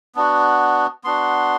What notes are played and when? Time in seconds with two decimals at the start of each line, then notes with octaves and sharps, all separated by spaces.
0.15 B3 D4 F#4
1.04 B3 D4 F#4 C6